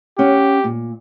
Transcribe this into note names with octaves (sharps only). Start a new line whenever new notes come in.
C#4 G4 F#5
A#2